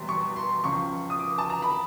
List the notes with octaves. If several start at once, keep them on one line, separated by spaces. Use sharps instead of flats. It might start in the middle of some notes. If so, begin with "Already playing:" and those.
Already playing: E1 E2 B2 G3 C6
C#6
C6
C#2 C#3 F3 C#6
D#6
D6
A5
A#5
B5